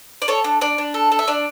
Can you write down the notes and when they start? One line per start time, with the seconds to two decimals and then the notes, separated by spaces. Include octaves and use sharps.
0.22 D5
0.28 A4 C#5
0.44 D4
0.61 D4 D5
0.78 D4
0.94 A4
1.12 A4
1.19 E5
1.28 D4 D5